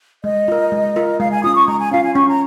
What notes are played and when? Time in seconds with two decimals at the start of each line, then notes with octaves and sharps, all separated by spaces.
0.24 G#3 D#5
0.48 F4 A#4
0.72 G#3
0.96 F4 A#4
1.20 G#3 F5
1.31 G#5
1.44 C#4 F4 D#6
1.56 C#6
1.68 G#3 A#5
1.80 G#5
1.92 C#4 F4 F5
2.04 G#5
2.15 C#4 C#6
2.29 A#5